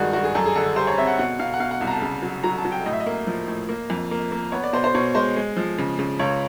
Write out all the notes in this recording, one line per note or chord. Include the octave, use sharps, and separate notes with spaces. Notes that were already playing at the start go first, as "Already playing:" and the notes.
Already playing: G2 D#3 G#3 F#4 G#4
G2 F#4
G#4
F#2 A4
G#4
D3 A4
G3 C5
C#5
C4 E5
F#5
B2 F#5
B2 F5
F#5
B2 F5
F#5
C2
A#5
A5
C#3
F#3
F#3 A#5
A5
F#3
G5
A2 D#5
E5
D#5
A#3
F3
A2
A#3
F2
A#3
A#3
B3 C#5
D5
B2 C5
C5
B2 C#5
G#3 C5
G#3
F3
C#3
C#3
C#2 C#5